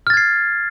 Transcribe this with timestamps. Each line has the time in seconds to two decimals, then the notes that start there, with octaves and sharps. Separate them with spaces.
0.07 F6
0.10 A6
0.14 G#6
0.17 C7